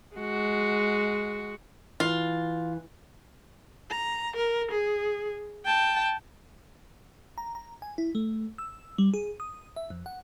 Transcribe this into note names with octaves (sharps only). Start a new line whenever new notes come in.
G#3 F#4
E3 F4
A#5
A#4
G#4
G5 A5
A#5
A#5
G#5
E4
A3
E6
G3
G#4
D#6
E5
F2
F#5